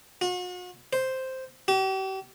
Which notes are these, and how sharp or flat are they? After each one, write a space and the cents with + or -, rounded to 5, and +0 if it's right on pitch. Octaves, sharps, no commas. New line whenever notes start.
F#4 -40
C5 +0
G4 -40